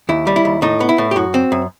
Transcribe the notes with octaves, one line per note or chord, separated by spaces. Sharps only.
D#2 E4
G3
E4
D#2
A2 D#4
B3
E4
A2
G4
F#2 F#4
C4
F#2